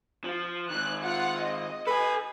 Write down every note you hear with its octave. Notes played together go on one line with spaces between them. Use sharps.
F3 F4
G#2 D#3 F#6
F4 F#5
D#5
A4 B4 G#5